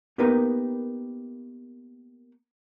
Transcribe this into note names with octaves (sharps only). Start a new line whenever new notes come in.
A#3 B3 D#4 G4 A#4 B4